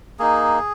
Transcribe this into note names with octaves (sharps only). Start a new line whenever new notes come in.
A#3 D#4 G#4